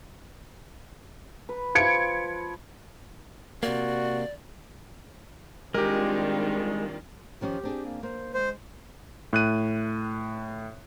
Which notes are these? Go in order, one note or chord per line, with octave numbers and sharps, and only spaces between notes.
B4
F3 B4 G#6 C#7 D7
C3 A#3 F#4 D5
D#3 G3 G#3 C4 D4 F4 G4 A#4
D#3 F3 C#4 G4
C4 D4 G#4
A#3
A#3 C5
G#3 C5
A2 F#6 D#7